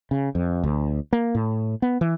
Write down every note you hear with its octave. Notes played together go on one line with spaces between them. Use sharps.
C#3
F2
D2
A#3
A2
B3
E3